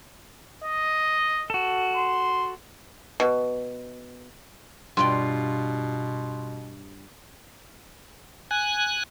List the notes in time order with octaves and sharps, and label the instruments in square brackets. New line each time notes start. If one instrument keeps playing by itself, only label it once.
[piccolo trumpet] D#5
[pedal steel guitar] F#4 A4
[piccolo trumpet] C6
[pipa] B2
[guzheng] G2 D5 G5 [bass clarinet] B2 [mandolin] F4
[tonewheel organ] G#5 F#6